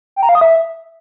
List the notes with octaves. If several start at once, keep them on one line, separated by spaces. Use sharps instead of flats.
G5
A#5
F5
D#6
E5